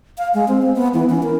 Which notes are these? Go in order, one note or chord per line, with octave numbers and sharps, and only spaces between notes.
F5
G#3
C4
C4
B3
E3
C#4
A#4